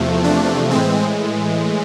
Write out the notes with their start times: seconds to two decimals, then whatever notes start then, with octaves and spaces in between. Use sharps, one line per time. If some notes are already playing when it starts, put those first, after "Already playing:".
Already playing: E2 C3 F3 A3
0.24 D4
0.71 A2 E3 G#3 C4